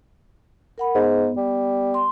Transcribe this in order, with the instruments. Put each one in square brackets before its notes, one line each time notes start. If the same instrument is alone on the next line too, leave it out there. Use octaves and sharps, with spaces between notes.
[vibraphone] A#4 F#5 B5
[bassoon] G#2 [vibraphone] B3
[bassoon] G3
[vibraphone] C6